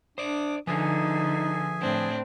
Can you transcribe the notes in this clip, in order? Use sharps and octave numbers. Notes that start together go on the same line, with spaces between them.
D4 C5 D5 D6 D#6
D3 F3 D#4 G#4 B4 E5 G#5
A2 C4 D4